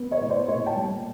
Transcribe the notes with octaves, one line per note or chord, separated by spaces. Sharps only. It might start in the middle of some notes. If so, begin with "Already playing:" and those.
Already playing: B3
C#5 D#5
A2
C5 D5
A#2 C#5 D#5
G5 A5
G3